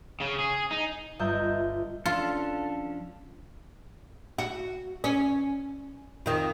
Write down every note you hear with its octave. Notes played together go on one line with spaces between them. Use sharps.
C#3
G#4
D#4
G1 F4 D#5 E5 A#5 G6
F3 C#4 D4 F4 A4
F#4
C#4
F2 D#3